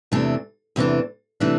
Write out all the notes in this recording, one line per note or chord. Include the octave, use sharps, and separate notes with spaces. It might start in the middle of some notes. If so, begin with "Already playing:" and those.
E2 C3 E3 A3 D4
E2 C3 E3 A3 D4
C3 E3 A3 D4